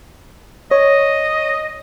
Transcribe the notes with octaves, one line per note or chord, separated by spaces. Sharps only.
C#5 D#5